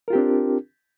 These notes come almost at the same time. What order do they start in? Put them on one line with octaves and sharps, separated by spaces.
A#4 F4 G4 C4 D4